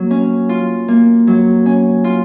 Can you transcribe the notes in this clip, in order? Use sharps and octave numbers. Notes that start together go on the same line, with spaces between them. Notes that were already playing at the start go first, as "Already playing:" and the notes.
Already playing: F#3 A#3
C#4
F4
A#3
F#3
C#4
F4